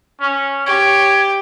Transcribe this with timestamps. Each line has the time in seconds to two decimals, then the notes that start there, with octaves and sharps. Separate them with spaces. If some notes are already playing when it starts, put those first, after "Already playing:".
0.21 C#4
0.66 G4 C#5 G#6